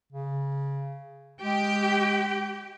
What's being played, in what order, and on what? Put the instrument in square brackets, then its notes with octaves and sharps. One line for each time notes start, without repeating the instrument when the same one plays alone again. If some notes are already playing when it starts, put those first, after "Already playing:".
[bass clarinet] C#3
[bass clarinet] G#3 [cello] G4 G5